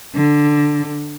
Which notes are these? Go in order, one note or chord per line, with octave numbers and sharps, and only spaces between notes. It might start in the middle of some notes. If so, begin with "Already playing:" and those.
D3